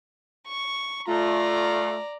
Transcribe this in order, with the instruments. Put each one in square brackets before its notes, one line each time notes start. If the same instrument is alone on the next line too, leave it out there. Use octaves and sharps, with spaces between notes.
[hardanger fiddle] C#6
[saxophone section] A3 F4 [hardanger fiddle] D5 A#5